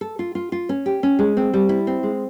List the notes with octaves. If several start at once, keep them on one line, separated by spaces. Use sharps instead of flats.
A4
F4
F4
F4
C#4
G4
C#4
G#3
C4
G3
E4
C4
G#3